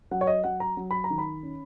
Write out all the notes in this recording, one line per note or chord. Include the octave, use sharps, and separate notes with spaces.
F#3 F#5
C#5
D#5
F#3 F#5
A#5
F#3
B5
A#5
D#3
B5
C#4